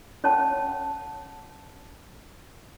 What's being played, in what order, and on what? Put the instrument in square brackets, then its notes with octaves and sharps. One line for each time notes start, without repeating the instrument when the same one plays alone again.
[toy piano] C#4 C#5 F#5 A5